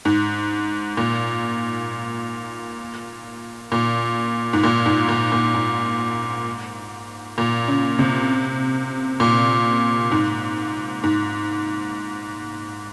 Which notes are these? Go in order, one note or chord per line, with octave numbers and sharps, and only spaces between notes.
G#2
A#2
A#2
G#2
A#2
G#2
A#2
A#2
G#2
A#2
C#3
C3
A#2
G#2
G#2